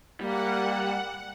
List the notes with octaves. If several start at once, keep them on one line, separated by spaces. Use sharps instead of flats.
G3 A#3 F#5